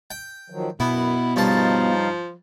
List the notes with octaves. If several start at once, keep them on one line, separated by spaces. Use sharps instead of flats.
G5
D#3 F3 F#3
F#2 B2 B3 E4
G2 C#3 F3 D#4 F5 A5